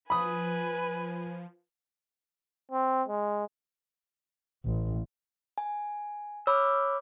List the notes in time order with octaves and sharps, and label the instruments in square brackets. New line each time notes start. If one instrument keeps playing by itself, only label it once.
[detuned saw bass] F3 [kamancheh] B4 G#5 [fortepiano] B5 D#6
[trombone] C4
G#3
[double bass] A1
[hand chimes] G#5
[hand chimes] C#5 B5 D6 [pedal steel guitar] E6 F6